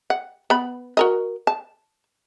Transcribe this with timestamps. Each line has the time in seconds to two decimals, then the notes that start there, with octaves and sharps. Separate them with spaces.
0.10 F#5
0.50 B3 B5
0.97 F#4 A#4 D#5
1.47 A5